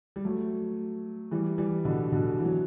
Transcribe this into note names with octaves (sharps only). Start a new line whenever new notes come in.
G3
F#3 A3
E3 G3
E3 G3
B2 D3
B2 D3
E3
F#3